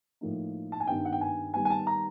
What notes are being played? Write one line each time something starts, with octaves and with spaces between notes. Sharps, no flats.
A2 F3 A#3 D#4
A5
G#5
G2 D#3 G3 B3 D#4 G5
F#5
G5
G#5
D#3 G3 B3 G#5
G#5
A5
A#5